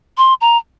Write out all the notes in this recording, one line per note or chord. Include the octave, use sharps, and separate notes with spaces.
C6
A#5